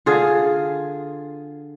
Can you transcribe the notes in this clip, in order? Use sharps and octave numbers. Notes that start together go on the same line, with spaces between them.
D3 F4 G#4